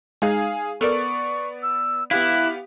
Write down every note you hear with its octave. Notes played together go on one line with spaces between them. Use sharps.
G#3 D#4 G#4 F5 G#5
B3 A4 A#4 D5 C#6
E6
B3 E4 G4 F5 F#6